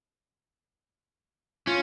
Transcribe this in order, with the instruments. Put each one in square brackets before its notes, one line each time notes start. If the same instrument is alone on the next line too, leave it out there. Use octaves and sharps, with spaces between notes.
[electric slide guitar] C#4 [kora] F4